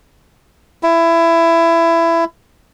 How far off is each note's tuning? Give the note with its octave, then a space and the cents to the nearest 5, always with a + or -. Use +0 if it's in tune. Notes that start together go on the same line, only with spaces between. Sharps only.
E4 +20